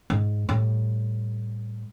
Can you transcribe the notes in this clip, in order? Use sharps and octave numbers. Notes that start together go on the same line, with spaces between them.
G#2
A2 G3